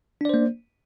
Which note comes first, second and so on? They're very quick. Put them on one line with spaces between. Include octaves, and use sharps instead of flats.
D4 D5 C5 A#3